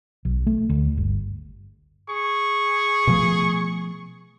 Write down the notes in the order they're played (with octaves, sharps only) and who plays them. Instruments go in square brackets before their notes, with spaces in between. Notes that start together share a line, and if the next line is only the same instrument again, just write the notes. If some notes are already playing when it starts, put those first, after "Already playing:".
[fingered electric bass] B1
A3
D2
G1
[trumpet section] G#4 C#6
[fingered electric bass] B2 F3 A3